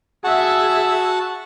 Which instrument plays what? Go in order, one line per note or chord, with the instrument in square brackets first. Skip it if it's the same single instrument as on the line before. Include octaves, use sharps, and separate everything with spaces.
[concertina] F#4 F#5 A5 [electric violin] G#4 E5